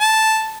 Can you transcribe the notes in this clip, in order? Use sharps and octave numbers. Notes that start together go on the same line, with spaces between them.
A5